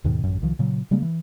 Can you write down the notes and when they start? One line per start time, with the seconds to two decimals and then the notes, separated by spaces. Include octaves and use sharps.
0.04 D#2 G#2 B2 D#3
0.23 A1 F#2
0.42 C2 D#3 F3
0.59 A#2 C#3 F#3
0.91 C#3 G3 G#3 A#3
1.02 E3